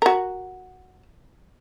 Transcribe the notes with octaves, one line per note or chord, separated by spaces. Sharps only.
F#4 A#4